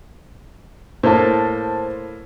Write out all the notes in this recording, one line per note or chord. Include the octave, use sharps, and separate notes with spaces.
A2 A#3 C5 A5